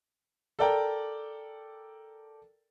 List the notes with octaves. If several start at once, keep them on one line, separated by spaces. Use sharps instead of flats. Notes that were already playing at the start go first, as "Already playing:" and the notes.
A4 A#4 D5 G5 A#5